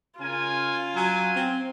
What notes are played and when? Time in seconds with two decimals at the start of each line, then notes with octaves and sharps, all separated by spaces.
0.20 C#3 C#4 F4 A#4 G#5
0.96 F#3 G#5
1.35 C4